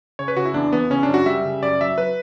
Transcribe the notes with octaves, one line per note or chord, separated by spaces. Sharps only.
C#3 C#5
B4
C#3 F#4
E4
E2 D4
E3 B3
C#3 C#4
D4
F#2
F#4
G3 E5
C#3
F#2 D5
F#3 E5
F#3 B4